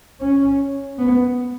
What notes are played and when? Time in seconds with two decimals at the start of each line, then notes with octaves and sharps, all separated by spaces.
0.21 C#4
0.98 B3